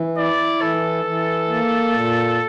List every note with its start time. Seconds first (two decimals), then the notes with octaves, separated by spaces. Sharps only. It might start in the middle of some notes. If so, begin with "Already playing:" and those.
Already playing: E3
0.17 E4 D5
0.61 E3 A4
1.05 E3
1.48 A#3
1.91 A#2